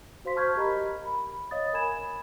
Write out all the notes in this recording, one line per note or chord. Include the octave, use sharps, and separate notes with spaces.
F#4 C5 F5 C6 B6
A5 C#6 F6 G6 G#6 B6
G4 A#4 D#5 A#5 B5
B5
C#5 D#5 F5 D#6 A6
A#4 G#5 B5 G#6 E7